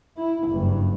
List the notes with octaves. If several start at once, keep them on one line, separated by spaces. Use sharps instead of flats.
E4
F#1 G2